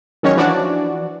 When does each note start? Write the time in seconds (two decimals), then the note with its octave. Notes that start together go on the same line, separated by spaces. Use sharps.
0.23 D#3 F#3 G#3 C#4 C#5
0.37 E3 F3 D4 F#4 D5